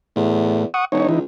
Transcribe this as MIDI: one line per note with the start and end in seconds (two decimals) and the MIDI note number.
0.16 0.64 40
0.16 0.65 45
0.74 0.85 78
0.74 0.85 85
0.74 0.85 87
0.92 1.06 28
0.92 1.07 63
0.92 1.07 73
1.09 1.23 37
1.09 1.19 52
1.09 1.19 63